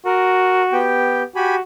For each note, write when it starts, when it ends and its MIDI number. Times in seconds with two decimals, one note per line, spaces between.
0.06 0.91 66
0.06 0.62 70
0.72 1.23 59
0.72 1.23 67
0.72 1.23 79
1.36 1.61 66
1.36 1.55 67
1.36 1.55 80
1.36 1.55 83